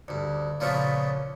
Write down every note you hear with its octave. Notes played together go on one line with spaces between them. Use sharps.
D2 G2
A#2 C#3 F3 A3 B3 F4